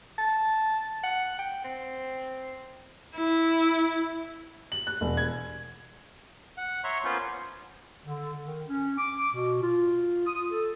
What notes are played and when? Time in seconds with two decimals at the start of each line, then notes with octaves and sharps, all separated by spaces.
0.18 A5
1.04 F#5
1.39 G5
1.64 C4
3.16 E4
4.72 F#7
4.87 F#6
5.01 E1
5.17 G#6
6.57 F#5
6.84 C#5 E5 A#5 C6 C#6
7.04 A#3 B3 C#4 F4 B4 C5
8.06 D3
8.45 D#3
8.69 C#4
8.98 D6
9.33 B2
9.62 F4
10.27 D#6
10.51 A4